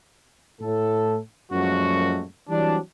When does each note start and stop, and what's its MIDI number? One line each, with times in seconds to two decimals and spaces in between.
0.61 1.18 45
0.61 1.18 69
1.52 2.24 42
1.52 2.24 46
1.52 2.24 53
1.52 2.24 56
1.52 2.24 57
1.52 2.24 66
2.50 2.78 52
2.50 2.78 54
2.50 2.78 55
2.50 2.78 60
2.50 2.78 62